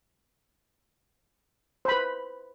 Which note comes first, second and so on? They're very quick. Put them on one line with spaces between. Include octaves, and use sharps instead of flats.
C5 B5 B4